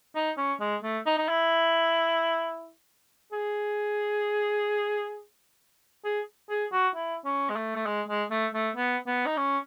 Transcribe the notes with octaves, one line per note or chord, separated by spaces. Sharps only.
D#4
C#4
G#3
A3
D#4
D#4
E4
G#4
G#4
G#4
F#4
E4
C#4
G#3
A3
A3
G#3
G#3
A3
A3
B3
B3
D#4
C#4